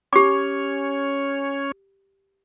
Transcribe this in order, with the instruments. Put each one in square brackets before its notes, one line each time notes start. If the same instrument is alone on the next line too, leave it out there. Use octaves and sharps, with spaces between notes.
[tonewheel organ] C#4 C#5 [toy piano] G4 D6